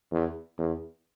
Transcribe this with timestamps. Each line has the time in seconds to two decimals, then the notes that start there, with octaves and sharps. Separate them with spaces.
0.11 E2
0.58 E2